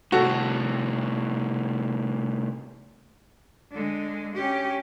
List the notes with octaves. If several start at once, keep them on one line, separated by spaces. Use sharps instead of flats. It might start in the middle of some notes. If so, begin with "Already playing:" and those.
A2 C3 F#4 A4
D3 G#3
C#4 G4